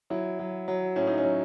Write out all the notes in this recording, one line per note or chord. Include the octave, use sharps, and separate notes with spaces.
F#3 E4
F#3
F#3
A2 C#4
D#4
C#4
F#3